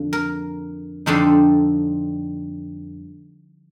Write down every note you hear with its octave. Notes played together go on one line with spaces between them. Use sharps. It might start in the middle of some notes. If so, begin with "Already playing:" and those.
Already playing: F2 D3
A#4
F2 D3 G3 C4 D#4 A4